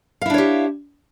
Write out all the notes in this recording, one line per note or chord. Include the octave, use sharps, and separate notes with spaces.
D4 E4 G4 C#5 F5